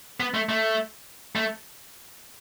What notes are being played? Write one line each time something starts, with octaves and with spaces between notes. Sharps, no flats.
B3
A3
A3
A3